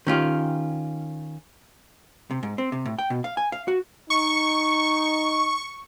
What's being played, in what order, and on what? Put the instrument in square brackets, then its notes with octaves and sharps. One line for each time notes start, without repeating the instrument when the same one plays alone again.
[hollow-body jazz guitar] D#3 C#4 F4 G4
C3
G#2
C4
C3
A2
G5
B2
F5
G#5
F5
F#4
[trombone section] D#4 [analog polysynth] C#6